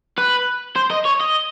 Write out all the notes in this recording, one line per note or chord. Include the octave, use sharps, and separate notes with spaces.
B4
C5
D#5
C#5
D#5